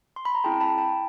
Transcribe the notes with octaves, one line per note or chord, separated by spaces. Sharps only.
C6
B5
A#5
C4 E4 G#4 G5 A5
A5 B5
G5 A5